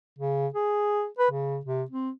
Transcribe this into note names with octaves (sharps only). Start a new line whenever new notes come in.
C#3
G#4
B4
C#3
C3
C4